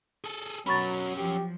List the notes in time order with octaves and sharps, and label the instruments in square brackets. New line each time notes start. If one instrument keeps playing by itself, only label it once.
[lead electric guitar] G#4 A4
[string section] B2 [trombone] F#3 [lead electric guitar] C#4 A#4 [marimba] B5 C#6 A6
[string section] F3 F#3 [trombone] G4